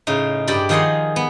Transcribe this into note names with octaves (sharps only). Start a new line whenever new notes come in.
A2 C#3 D#4
G2 G4 D5 B5
D#3 F3 G#4 D#5 F#5 C6
B3